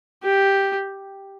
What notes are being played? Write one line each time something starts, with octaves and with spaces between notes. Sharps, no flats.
G4